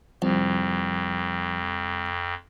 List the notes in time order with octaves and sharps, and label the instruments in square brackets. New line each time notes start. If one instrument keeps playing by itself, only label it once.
[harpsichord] C2 [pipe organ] F2 [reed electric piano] F3